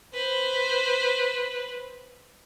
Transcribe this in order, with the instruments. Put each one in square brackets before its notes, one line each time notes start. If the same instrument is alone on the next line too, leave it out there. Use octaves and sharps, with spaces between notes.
[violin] B4 C5